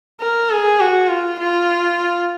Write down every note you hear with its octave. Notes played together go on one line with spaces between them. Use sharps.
A#4
G#4
F#4
F4
F4